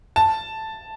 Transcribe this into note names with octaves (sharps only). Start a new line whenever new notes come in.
A5